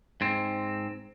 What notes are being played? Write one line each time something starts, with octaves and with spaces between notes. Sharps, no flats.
G#2 C4